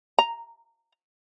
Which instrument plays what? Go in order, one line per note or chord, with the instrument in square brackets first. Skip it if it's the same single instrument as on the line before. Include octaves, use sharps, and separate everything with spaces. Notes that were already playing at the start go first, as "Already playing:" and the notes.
[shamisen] A#5